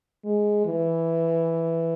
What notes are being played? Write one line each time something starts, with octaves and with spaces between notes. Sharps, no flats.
G#3
E3